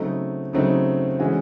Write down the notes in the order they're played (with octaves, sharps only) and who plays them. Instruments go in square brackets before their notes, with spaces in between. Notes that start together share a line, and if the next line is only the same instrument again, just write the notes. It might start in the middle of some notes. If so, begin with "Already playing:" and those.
Already playing: [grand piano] C#3 F#3 A3 C4 D#4
C#3 F#3 A3 C4 D#4
E3 G#3 C#4 F#4